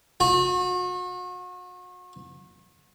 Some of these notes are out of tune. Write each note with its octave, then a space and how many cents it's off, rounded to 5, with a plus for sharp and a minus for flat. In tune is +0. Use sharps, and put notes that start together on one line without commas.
F#4 -40